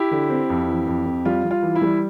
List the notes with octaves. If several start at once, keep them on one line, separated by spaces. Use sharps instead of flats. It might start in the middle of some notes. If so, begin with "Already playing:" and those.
Already playing: E4 G4
D3
C4
F2
E3
F2
F2
G3 F4
G3
F4
E3
E4
G3